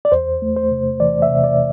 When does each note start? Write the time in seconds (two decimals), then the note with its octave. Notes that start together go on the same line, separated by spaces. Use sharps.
0.05 D5
0.12 E2 C5
0.42 A3
0.56 C5
0.71 C3
1.00 E3 D5
1.22 E5
1.29 C3
1.44 D5